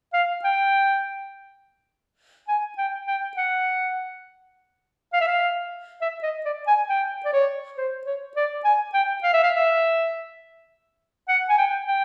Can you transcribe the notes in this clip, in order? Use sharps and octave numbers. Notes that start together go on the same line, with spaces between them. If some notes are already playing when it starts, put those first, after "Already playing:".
F5
G5
G#5
G5
G5
F#5
F5
E5
F5
E5
D#5
D5
G#5
G5
D5
C#5
C5
C#5
D5
G#5
G5
F5
E5
F5
E5
F#5
G#5
G5
G5